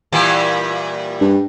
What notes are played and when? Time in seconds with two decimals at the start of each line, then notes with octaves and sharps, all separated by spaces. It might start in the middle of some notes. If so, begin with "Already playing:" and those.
0.12 A#2 E3 G3
1.21 G2